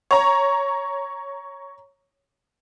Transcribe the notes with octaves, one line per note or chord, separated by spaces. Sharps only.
C#5 A#5